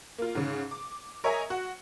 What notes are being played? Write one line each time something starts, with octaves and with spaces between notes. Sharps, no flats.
A#3 F4
G#2 C#3
D6
A#4 C#5 D#5 E5 G#5 A#5
F#4